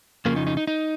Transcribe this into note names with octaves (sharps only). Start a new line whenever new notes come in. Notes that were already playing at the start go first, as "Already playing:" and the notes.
F2 C#3 F3 A#3
D#4
D#4
D#4
D#4